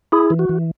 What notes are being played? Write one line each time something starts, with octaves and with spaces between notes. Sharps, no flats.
E4 G#4
E3
F#4
E3